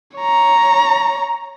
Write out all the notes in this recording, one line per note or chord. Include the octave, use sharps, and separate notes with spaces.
C#5 A#5